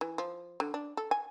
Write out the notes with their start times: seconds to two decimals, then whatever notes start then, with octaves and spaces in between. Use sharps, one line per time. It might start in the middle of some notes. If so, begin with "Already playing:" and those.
0.01 E3
0.18 F3
0.60 D3
0.74 D4
0.97 A4
1.11 G#5